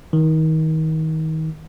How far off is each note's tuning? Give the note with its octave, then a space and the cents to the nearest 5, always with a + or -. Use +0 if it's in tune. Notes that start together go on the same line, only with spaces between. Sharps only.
D#3 +30